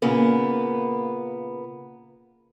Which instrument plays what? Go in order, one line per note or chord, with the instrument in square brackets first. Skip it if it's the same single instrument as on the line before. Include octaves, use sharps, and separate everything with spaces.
[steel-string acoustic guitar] A#2 C#3 A#3 B3